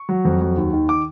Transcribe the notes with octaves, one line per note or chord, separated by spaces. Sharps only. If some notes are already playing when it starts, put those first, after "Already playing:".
Already playing: C#6
F#3
F2
F#3
D#2
D#3
D6